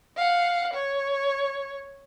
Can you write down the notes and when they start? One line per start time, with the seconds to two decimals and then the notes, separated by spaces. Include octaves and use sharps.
0.17 F5 F#5
0.73 C#5